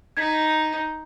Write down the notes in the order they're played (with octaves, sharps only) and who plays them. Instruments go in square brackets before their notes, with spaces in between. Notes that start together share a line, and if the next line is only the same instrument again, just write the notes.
[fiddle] D#4 [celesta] G#6 B6